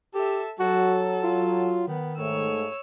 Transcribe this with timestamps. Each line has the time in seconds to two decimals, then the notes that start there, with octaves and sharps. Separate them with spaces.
0.14 G4 A4 E5
0.60 F#3 F#4 A4
1.23 F4
1.88 D#3 B3
2.18 G#2 A3 C#5 E6